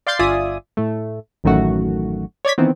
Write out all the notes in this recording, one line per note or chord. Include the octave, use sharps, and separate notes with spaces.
D5 F5 C6 G6 A6 C7
G1 F4 D5 E5 G#5 D#6
A2 A3
A1 F#2 D#3 A3 F#4
C#5 D5 G#6 B6
D#3 E3 B3 C4